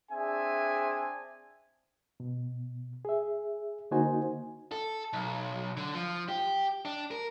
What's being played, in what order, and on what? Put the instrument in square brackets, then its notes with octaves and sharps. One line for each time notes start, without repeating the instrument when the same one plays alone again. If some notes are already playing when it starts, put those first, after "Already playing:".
[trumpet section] C4 D4 G#4 E5 G#5
[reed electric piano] B2
G#4 E5
D3 A#3 D#4 F#4 C5 G#5
[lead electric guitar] A4
B1
D3
F3
G4
D4
A#4